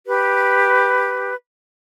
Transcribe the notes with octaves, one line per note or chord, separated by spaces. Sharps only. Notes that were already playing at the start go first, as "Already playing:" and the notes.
G4 B4